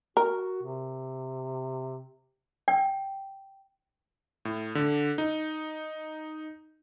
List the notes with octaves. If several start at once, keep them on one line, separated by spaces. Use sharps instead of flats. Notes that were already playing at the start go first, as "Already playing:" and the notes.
F#4 A#4
C3
G5
A2
D3
D#4